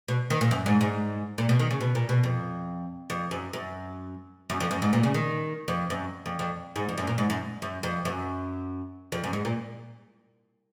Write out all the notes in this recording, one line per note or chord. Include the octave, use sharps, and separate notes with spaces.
B2
D#3
A#2
F#2
G#2
G#2
A#2
B2
D#3
C#3
B2
A#2
B2
F2
F2
F#2
F#2
F#2
F2
F#2
G#2
A#2
C#3
D#3
F2
F#2
F2
F2
G#2
F2
F#2
A#2
G#2
F#2
F#2
F2
F#2
F2
F#2
G#2
A#2